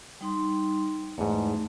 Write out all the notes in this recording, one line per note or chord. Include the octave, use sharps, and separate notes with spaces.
G3 D#4 C6
E2 G#2 A3